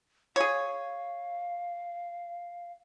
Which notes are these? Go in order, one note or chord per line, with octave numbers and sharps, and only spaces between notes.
G#4 C#5 F5